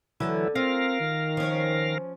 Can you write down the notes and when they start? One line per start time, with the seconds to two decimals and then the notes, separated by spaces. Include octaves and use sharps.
0.20 D2 D3 E3 F#3 E4 B4
0.56 C4 F4 A#4 F5
1.00 D#3
1.37 F3 C#4